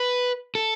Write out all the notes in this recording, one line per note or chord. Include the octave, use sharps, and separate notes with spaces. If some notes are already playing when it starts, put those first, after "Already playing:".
Already playing: B4
A4